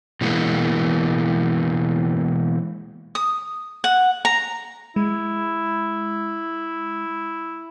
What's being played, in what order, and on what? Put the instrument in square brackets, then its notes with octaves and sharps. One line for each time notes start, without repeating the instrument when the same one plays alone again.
[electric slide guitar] B2 E3 G#3 A#3
[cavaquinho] D#6
F#5
A#5
[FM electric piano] G#3 [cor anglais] E4